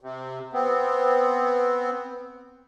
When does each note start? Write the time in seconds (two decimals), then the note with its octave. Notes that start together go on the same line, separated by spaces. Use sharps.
0.01 C3
0.53 B3 C4